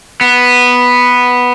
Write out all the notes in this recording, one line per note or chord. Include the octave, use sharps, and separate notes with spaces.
B3